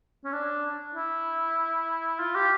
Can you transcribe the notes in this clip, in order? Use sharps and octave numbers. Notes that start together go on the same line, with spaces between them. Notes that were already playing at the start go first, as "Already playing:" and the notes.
C#4
D4
E4
F4
G4